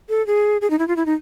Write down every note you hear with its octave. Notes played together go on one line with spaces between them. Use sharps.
A4
G#4
G#4
D#4
E4
F4
E4
D#4